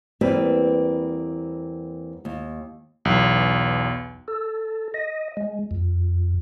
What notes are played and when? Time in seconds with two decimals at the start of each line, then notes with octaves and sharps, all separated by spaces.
0.21 E2 G3 A#3 C4 B4
2.25 D#2
3.05 B1 E2
4.28 A4
4.94 D#5
5.37 G#3
5.71 F2